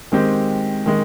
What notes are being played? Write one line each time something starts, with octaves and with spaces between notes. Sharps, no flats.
D#3 G#3 C4 G4
D#3 G#3